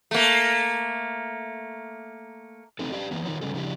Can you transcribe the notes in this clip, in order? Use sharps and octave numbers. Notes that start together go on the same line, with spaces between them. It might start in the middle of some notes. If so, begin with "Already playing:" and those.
A3 A#3
A3 C4 D#4 A4
G4 D5 E5 F5
E3 F3 A#3 B3
D#3 D#4 F4 C#5
C#3 G3 C#4 A4
C#3 F3 D4 E4 G4